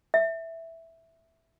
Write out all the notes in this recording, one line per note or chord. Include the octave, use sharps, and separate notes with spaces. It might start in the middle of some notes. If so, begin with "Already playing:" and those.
E5